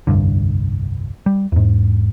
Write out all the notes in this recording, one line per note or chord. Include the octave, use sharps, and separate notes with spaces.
F1 C2 G2 D3
G3
E2 G#2